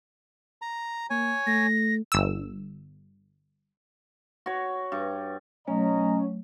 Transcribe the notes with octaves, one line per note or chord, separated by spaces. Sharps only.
A#5
A#3 C#5 G#5
A3 A#6
G1 E6
F#4 C#5
G2
B1 F#3 A3 C#4 D#5 A#5